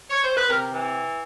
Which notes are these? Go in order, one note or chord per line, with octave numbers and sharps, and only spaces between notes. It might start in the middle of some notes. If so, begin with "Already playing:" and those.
C#5
C5
B4
C3 A#4
E3